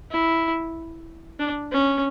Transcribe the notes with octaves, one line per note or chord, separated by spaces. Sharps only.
E4
D4
C#4